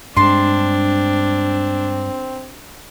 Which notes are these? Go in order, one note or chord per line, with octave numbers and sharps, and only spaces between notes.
G2 G#3 C4 D4 A5 C6